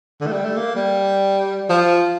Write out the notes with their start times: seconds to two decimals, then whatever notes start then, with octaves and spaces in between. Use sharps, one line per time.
0.21 D3
0.27 A3
0.32 G3
0.45 A3
0.57 A#3
0.76 G3
1.69 F3